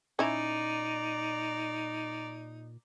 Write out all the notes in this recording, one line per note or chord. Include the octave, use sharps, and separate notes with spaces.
A#2 C#4 D#4 E4 D5 A#5